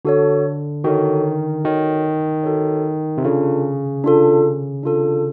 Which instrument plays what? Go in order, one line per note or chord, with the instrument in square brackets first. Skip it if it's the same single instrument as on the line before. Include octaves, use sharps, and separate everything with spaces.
[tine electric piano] D3 [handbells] F#4 A4 C#5
[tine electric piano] D#3 [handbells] F#4 A4 C#5
[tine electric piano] D#3 [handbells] F#4 A4 C#5
[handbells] F#4 A4 C#5
[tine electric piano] C3
[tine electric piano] C#3 [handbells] D4 F4 A4
[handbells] D4 F4 A4
D4 F4 A4